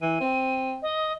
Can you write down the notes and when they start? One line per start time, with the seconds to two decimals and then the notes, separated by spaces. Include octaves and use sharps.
0.02 E3 D#7
0.21 C4
0.82 D#5